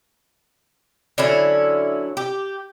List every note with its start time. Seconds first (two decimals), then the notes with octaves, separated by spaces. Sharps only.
1.18 D3 F#3 C#4 E4
2.17 G4